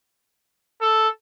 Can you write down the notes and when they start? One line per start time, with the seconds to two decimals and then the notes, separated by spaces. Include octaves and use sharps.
0.82 A4